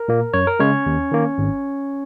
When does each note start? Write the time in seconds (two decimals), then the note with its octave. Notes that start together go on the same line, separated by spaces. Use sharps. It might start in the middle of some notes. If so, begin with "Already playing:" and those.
Already playing: A#4
0.08 A#2 A#3
0.34 F#2 C#5
0.47 A#4
0.59 C#3 G#3 C#4 C#5
0.86 D#2
1.11 D#3 A#3
1.38 G#1